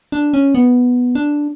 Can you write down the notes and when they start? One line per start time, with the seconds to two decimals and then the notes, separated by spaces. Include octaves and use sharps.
0.12 D4
0.34 C#4
0.55 B3
1.15 D4